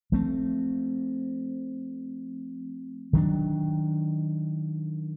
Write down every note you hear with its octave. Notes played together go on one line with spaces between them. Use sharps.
F3 A3 C4
D#3 F#3 B3 D4